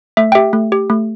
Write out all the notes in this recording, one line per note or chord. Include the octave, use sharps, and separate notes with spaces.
A3 E5
G5
G4 E5
A3
G4
A3